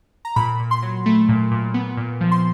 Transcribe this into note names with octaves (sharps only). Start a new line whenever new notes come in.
A#5
A#2 B5
A#2
C6
F#3
A3
A#2
A#2
B3
A#2
F3
C6